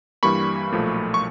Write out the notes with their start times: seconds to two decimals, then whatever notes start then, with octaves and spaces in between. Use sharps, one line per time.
0.23 G2 E3 G3 A#3 B5 C#6
0.72 B1 A#2 F3 A3
1.14 C#6